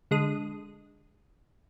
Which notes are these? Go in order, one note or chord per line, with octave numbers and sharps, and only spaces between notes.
D3 G#3 D#6